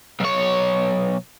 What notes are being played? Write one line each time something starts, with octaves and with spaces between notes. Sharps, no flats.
B1 C#5